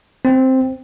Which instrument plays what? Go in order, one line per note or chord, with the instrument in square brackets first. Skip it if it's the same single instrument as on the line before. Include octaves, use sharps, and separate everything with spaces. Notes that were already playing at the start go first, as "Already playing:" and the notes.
[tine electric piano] C4